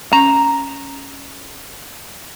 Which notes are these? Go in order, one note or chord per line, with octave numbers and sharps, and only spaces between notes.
C#4 A#5